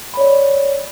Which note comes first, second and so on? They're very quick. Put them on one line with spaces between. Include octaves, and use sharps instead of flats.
B5 C#5 D5